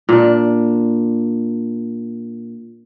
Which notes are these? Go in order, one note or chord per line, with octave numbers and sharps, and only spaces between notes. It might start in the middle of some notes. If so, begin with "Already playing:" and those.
A#2 D4